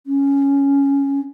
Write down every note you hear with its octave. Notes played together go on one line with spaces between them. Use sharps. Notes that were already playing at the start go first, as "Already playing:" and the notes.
C#4